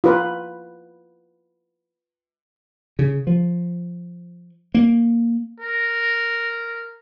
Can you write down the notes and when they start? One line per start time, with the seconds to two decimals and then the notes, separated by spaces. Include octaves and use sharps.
0.04 F4 B4
2.99 C#3
3.27 F3
4.74 A#3
5.60 A#4